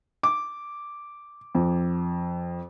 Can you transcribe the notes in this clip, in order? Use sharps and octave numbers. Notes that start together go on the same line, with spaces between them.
D6
F2